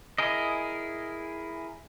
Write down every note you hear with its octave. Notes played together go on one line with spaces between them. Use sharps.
E4 G#4 A#4 D#5